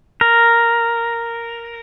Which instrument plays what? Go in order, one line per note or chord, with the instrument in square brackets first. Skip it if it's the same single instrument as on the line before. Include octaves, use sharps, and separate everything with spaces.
[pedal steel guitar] A#4